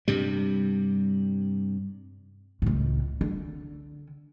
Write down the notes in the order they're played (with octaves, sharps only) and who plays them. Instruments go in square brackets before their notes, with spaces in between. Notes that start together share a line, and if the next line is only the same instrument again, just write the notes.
[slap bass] G2 C3 G3
[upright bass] C#2 A2
D3